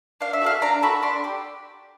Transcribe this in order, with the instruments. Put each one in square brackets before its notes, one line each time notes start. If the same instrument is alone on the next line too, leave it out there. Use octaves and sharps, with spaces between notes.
[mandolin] D4 F5
E5
F#4 A4 F5
D4 A#5
F#4 A4 B5
D4 C6
G4